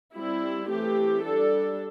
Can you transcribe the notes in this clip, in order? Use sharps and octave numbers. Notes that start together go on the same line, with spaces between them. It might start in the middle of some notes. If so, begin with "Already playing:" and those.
G3 C4 E4
E3 A3 C4 G4
G3 D4 A4